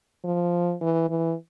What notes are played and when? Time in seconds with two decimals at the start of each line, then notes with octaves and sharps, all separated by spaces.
0.24 F3
0.81 E3
1.09 E3